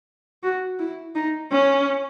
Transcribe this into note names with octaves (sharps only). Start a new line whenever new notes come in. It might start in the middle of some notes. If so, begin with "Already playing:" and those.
F#4
E4
D#4
C#4